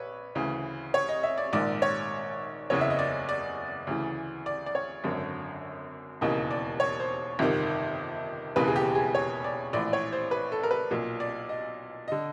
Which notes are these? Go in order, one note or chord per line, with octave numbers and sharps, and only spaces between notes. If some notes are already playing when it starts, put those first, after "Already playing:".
Already playing: A#1 B4 C#5
D2 C#3 E3
C#5
D#5
E5
D5
A#1 G#2 D#3 D5
C#5
F#1 E2 C#3 C#5
E5
D#5
D5
D5
D2 C#3 E3
D5
D5
C#5
G#1 F#2 D3
E1 D#2 C#3 E3 D#5
D5
C#5
C5
G1 F2 C3 D#3
E1 D#2 C#3 E3 B4
G#4
G4
G#4
C#5
D5
A#1 A2 E3 D5
C#5
C5
B4
A4
A#4
B4
B1 A#2
D5
D#5
D3 D#5